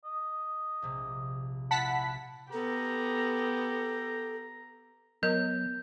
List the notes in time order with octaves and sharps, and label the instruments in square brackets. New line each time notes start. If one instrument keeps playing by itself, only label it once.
[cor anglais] D#5
[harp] A#1 C3
[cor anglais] E4 [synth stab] F#5 A5 B6
[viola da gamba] B3 [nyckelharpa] G4 [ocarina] A4 [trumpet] A#5
[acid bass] F#3 [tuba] B3 [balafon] A#4 D#5 [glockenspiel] G6